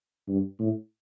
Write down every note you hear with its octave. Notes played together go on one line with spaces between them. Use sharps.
G2
A2